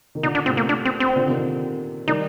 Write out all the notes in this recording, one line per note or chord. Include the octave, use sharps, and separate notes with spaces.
D#3
A#2 D3 D#4
D4
A2 C3 C4
A#3
D4
C4
C4
A#2 D3
C3 D#3
D#3 G3 D#4